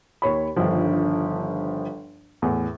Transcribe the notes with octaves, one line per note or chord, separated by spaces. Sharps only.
D#2 C#5 B5
G1 G2 D3 D#3 F3
E2 A2